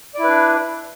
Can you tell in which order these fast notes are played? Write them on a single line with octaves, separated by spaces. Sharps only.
D5 E4 B4 D4